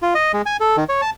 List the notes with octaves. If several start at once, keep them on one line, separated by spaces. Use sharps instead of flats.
F4
D#5
G#3
G#5
A4
D#3
C#5
A5